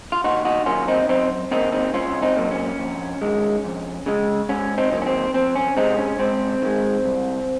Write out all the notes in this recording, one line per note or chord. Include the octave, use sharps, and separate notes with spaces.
F4
D#2 D#4 F#4
D#4 F#4
D#3 F#3 A#3 C#4 F4
C4 D#4
F#2 C4 D#4
D#3 F#3 A#3 C4 D#4
C4 D#4
C2 C#4 F4
C4 D#4
A#2 F#3 A#3
C#4
F2
D#3 G#3
F2
C#3 G#3
G#2 C#4
C4 D#4
D#3 F#3 A#3
C#4
C4
F2 C4
C#4
C3 F3 G#3 C4 D#4
C#4
G#2 C4
D#3 G#3
C2